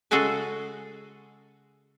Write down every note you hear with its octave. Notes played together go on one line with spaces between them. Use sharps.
C#3 G#3 F#4 G#4 A4